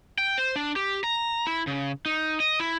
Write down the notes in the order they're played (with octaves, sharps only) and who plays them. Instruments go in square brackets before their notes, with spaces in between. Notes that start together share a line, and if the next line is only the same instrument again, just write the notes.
[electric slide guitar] G5
C5
D4
G4
A#5
E4
C#3
D#4
D#5
E4